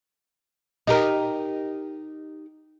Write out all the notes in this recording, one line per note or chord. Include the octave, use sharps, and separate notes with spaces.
D#4 G4 A#4 D#5 A#5